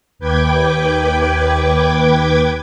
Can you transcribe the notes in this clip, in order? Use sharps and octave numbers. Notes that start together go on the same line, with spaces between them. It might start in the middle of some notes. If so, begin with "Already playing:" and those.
D#2 B4 G5 D6 G#6